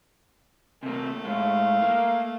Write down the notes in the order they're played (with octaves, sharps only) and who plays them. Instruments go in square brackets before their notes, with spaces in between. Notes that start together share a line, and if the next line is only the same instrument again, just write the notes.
[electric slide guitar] C3 A#3 [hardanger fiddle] A3
[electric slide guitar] A2 G#3 [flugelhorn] F5
[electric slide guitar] A#3